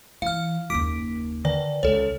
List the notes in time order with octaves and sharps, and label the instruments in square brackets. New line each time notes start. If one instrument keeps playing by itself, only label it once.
[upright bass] E3 [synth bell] F5 F6
[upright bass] F#1 D#2 [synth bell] D6 B6 D7
[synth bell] D3 D#3 D5
[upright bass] C#2 [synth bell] A4 C#5